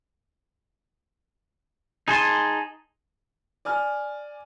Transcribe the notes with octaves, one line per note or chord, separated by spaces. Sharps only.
D#4 G#4 G#5 A5 C6
D5 G#5 F6